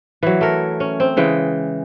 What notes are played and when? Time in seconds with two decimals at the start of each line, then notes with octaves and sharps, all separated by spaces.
0.23 E3 F#3
0.41 A3 A#4
0.80 C#4
1.00 C4
1.17 C#3 E3 G#3 G5